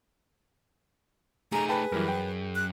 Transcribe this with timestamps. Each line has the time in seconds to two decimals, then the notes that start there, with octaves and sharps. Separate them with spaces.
1.52 A3 D#4 G#4 A#5
1.69 B4 G5 A5 B5
1.92 F#2 E3 G3 A#4
2.08 G5
2.55 F#6